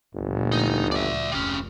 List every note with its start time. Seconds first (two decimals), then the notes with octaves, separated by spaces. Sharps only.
0.14 G1 D2 A#2 F3
0.52 D#4
0.91 D5 E5
1.32 F1 C3 C#4